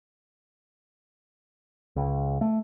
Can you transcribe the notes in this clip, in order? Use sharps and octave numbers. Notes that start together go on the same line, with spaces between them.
C#2
A3